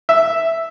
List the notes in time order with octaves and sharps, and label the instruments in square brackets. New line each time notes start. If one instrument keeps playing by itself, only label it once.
[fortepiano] E5